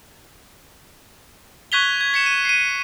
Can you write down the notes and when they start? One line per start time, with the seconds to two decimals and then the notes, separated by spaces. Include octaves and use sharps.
1.72 C#6 F#6 G#6 B6 F7 G7
2.01 G#6
2.14 B6 C#7 E7
2.26 D#7
2.45 C7 D#7